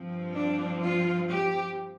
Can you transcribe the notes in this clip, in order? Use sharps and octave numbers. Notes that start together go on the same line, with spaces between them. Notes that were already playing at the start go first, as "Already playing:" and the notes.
Already playing: G2 F3 C4
D4
F4
G4